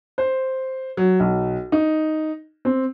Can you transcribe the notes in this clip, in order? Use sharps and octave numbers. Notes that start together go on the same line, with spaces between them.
C5
F#3
B1
D#4
C4